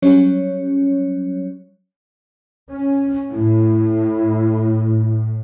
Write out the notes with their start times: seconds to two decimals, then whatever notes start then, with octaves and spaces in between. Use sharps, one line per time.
0.02 F#3 G3 C#4 C#5
2.70 C#4
3.31 A2 E4